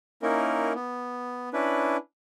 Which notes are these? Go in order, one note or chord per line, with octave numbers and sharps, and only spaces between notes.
A#3 C#4 D#4 E4 A#4
B3
C#4 D4 E4 B4